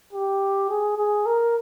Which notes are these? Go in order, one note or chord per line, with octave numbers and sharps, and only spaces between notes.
G4
G#4
G#4
A#4